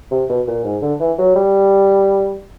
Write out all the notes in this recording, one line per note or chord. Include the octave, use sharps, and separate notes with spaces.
C3
B2
A#2
G#2
D3
E3
F#3
G3